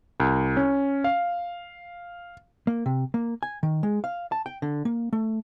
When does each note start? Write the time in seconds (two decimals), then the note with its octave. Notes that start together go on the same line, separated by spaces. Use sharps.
0.20 C2
0.57 C#4
1.04 F5
2.67 A#3
2.86 C3
3.14 A#3
3.43 G#5
3.63 D#3
3.83 G#3
4.04 F5
4.32 A5
4.46 G5
4.62 D3
4.85 A#3
5.13 A3